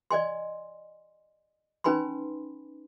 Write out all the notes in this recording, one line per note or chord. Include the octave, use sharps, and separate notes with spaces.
D5 D#5 G#5 C6
C#4 D#4 B4 G#5 B5 C6